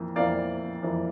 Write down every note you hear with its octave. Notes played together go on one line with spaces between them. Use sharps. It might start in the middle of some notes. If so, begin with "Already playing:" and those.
Already playing: F2 E3 A#3
F2 E3 A#3 D5 F5
F2 E3 A#3